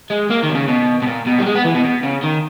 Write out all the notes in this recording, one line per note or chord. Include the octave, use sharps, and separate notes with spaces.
G#3
A#3
D#3
B2
C#3
B2
B2
A#2
B2
G3
G#3
B3
E3
B2
B2
C#3
D#3